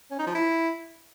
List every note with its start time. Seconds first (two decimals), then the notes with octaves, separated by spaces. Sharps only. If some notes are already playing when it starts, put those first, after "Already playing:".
0.11 C#4
0.19 D#4
0.27 F3
0.35 E4